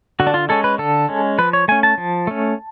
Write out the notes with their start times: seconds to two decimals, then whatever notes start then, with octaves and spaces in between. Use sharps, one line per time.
0.20 D3 F#4
0.27 D4
0.34 F4
0.49 G#3 C#4 A4
0.64 B4
0.78 D3 A4
1.09 G#3 C#4
1.38 F3 B4
1.53 C#5
1.68 A3 C#4 G#5
1.83 A5
1.98 F3
2.27 A3 C#4